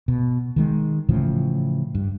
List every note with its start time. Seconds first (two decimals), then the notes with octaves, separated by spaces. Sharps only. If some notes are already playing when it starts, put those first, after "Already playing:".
0.08 B2
0.56 D#3 E3 G#3
1.09 A2 C#3 E3 F3
1.95 G2